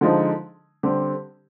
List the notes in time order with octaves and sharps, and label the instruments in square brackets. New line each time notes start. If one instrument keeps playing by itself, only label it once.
[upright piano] D3 F3 G#3 D#4
D3 G3 C4 G4